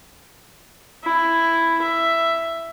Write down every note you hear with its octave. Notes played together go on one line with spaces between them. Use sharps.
E4
E5